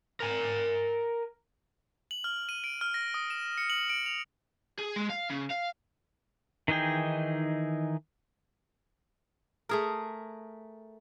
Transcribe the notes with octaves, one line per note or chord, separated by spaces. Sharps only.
A#4 G#5
F#7
F6
D#7
D7
F6
A#6
D#6
E7
C#7
F#7
D7
F7
G#4
G#3
F5
C#3
F5
D#3 E3 D#4 G#4 G5
A3 G#4 A#4